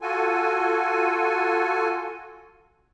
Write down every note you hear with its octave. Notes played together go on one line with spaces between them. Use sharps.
F4 F#4 A4 G#5